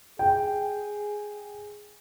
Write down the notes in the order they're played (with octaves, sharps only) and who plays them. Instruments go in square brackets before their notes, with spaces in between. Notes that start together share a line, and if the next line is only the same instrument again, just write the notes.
[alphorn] G#4 [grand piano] G5